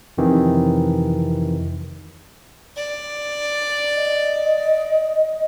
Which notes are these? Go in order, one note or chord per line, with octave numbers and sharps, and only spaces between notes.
F2 C3 D#3 E3
D5
D#5